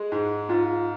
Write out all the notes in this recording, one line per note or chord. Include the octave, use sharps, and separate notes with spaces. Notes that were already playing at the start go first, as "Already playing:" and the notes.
Already playing: G#3 G#4
G#2
G#2 F4